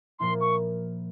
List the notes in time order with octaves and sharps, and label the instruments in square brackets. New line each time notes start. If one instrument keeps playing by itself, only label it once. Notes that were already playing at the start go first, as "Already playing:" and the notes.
[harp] A#2 F3 A#3 E4 [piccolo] C6
[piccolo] C#6